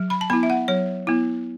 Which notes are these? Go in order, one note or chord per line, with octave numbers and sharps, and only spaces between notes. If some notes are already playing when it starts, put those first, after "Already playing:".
Already playing: F#3
B5
A5
B3 E4 B5
E5
F#5
F#3 C#5
B3 E4